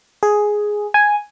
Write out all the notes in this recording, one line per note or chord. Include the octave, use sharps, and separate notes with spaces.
G#4
G#5